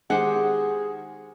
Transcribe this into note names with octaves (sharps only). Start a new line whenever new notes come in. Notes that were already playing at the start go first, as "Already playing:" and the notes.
D#3 G#3 G4 G#4 C5 F#5